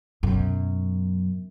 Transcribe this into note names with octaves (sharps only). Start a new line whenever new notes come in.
F#2 B2